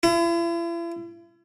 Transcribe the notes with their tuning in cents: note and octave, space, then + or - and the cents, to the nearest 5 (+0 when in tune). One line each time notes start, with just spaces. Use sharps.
E4 +45